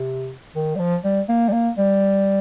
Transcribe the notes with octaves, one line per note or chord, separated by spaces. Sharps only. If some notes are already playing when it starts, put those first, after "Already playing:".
Already playing: C3
D#3
G3
F3
G3
A#3
G3
A#3
G3